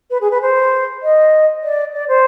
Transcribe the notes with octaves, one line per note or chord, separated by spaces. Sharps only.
B4
G#4
B4
C5
D#5
D5
D5
C5